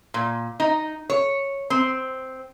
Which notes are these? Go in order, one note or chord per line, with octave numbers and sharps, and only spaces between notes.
A#2
D#4
C#5
C4